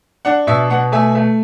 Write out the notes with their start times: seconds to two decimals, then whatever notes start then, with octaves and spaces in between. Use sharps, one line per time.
0.25 D4 F#5
0.47 B2 E5
0.70 B2 F#5
0.92 A3 E5 G#5
1.15 A3